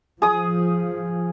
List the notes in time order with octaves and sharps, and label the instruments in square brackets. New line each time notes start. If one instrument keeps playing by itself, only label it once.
[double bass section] F3 [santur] G#4 D#6